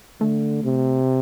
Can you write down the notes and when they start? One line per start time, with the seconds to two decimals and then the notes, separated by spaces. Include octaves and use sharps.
0.20 D3 A3
0.64 C3